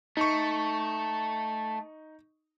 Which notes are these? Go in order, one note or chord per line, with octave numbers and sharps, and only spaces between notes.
A3 D#4 C#6